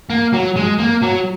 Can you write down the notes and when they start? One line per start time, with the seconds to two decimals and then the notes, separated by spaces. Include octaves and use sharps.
0.10 A#3
0.34 F#3
0.57 G#3
0.80 A#3
1.03 F#3